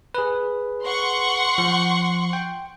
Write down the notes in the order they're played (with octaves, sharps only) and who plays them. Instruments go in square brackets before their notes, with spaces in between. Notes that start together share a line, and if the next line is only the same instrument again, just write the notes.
[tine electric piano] G#4 B4
[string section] F#5 C6 C#6
[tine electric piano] F3
G5